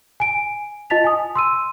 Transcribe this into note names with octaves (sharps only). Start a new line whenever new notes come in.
G#5 D7
F4 D#5 A5 A6 B6 F7
G#5 D#6
C6 E6 D#7